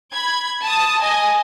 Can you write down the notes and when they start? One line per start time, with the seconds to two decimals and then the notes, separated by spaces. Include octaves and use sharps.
0.13 B5 G#6
0.62 A5 D#6
1.00 D#5 G#5